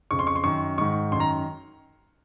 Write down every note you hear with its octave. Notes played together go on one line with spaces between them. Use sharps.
F2 C#3 C#6
C6
C#6
C6
F#2 D#3 C#6
G#2 D#3 C#6
F#2 D#3 A#5 C6